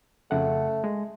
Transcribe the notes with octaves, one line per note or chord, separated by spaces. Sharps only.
F2 C#3 A3 F#5
G#3